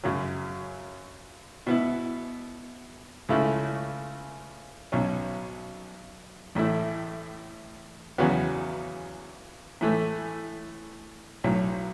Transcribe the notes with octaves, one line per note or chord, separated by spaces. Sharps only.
F#2 C#3 F#3
B2 B3 E4
C#2 C#3 A3 E4
B1 B2 F#3 C#4
A1 A2 A3 E4
E2 C#3 F#3 B3 F#4
A2 E3 A3
B1 A2 F#3